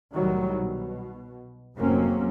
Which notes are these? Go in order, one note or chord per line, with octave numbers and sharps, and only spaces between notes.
C2 A2 D#3 F#3 G3
B2
F1 G#2 F#3 A#3 C4 C#4